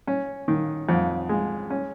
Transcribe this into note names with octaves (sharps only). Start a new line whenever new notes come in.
C#4
D#3
F2
G#3
C#4